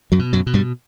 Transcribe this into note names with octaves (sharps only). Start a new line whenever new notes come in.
F#2 F#3
B2
F#2 F#3
B2
G2 G3